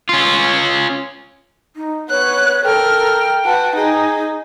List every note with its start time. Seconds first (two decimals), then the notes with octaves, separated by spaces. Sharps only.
0.09 C#4 F4
1.76 D#4
2.10 B3 C#5 F#6
2.64 A4 A#4 G5 F6
3.45 F#4 B4 A5
3.76 D#4 G#4